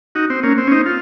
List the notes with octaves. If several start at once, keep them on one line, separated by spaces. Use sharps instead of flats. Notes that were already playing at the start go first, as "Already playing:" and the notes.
D#4 F#4
C4
A#3 C#4
C4
C#4
C4 D#4
F4